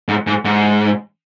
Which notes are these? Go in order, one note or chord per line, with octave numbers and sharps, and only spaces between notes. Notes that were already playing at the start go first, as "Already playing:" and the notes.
G#2
G#2
G#2